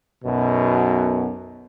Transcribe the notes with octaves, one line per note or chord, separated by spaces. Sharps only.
B1 F#2 B2